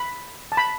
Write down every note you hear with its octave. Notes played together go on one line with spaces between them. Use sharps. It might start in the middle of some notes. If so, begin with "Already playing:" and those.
Already playing: B5
A5
B5